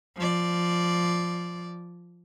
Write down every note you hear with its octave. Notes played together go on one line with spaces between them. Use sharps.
F3 D5